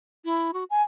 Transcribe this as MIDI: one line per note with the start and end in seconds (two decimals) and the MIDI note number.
0.25 0.51 64
0.53 0.64 66
0.70 0.82 80